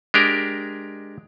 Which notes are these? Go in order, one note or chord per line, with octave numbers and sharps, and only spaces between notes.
G#3 D4 G4 A#4